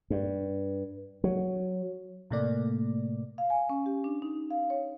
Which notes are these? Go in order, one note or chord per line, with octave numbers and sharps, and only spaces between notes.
G2
F#3
A2 C3 A3 A#3 D5
F5
G#5
C#4
G4
D4
D#4
F5
C#5